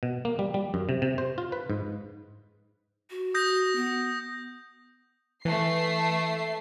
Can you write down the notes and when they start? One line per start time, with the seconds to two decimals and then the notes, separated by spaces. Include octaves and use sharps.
0.03 B2
0.25 A#3
0.39 G3
0.54 G3
0.74 F#2
0.89 C3
1.02 C3
1.18 C5
1.38 F4
1.52 B4
1.70 G#2
3.11 F#4
3.34 D#6 G6 A#6
3.76 B3
5.45 E3 A3 C7